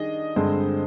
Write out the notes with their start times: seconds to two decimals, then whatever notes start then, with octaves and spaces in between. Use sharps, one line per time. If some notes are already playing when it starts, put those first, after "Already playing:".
Already playing: D#3 G3 D4 G#4 D5 D#5
0.36 G2 D3 G#3 C4 C5 D#5